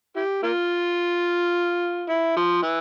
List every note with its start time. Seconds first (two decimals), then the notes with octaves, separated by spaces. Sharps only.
0.16 E4 G4
0.43 A#3 F4
2.09 E4
2.37 F3
2.63 E3